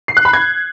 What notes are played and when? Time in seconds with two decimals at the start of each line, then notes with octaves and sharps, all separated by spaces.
0.08 C7
0.17 F#6
0.25 B5
0.33 G#6